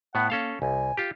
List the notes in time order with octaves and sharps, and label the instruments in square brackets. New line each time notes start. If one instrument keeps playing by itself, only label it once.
[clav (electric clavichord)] A2 B3 [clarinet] F#5
[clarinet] A#3 [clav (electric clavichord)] C#4 A4 F5
[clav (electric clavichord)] C2 [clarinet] G#5
[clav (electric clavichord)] F4 G4